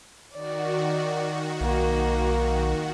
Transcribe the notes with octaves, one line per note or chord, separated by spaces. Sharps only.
D#3 F#4 D5
B1 A#3